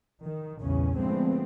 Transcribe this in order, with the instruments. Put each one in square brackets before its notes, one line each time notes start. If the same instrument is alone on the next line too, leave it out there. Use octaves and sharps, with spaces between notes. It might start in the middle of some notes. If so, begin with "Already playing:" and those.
[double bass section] D#3
A#1 E2 G2 C#3 C#4
D3 F3 G#3 A3 B3 C4